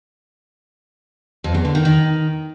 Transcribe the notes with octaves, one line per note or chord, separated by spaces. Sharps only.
F2
E2
D3
D#3
D#3